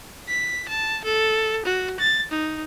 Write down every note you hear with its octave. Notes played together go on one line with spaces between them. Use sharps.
B6
A5
A4
F#4
A6
D#4